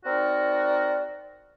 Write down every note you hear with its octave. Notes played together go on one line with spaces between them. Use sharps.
C4 D#4 F#4 A#4 D5